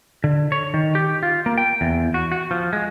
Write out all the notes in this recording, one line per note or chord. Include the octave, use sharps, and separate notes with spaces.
D3
C#5
D#3
G4
F4
A#3
G5
E2
F#4
F#4
F3
G#3